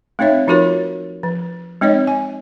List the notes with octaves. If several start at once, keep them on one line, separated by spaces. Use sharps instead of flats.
A3 C4 D#4 C#5 E5
F3 D#4 F4 F#4 A#4 C#5
F3
G#3 C4 D#4 C#5 D#5
G#5